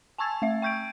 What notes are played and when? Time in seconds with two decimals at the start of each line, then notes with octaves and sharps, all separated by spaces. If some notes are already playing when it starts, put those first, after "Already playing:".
0.18 G#5 A5 C#6 E6 G#6 A6
0.42 A3 E5
0.62 G5 C#6 G6 G#6 D7